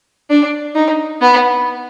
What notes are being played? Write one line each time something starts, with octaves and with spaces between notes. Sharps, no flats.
D4
D#4
B3